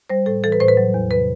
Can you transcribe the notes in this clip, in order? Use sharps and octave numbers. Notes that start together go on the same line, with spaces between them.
G3 C5
A2 A4
E3 A4
B4
A2 C5
B4
F#3
E2
C3 B4